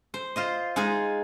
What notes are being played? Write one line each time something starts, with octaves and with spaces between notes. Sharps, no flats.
C5
F4 C5 D#5
G#3 D#4 F4 G#4